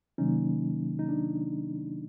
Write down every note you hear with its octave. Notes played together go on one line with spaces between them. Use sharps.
C3 D#3 F#3 A#3 C#4 D#4
D#4
D4